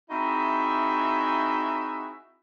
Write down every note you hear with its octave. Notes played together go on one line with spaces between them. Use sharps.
C4 D#4 E4 F#4 G#4 E5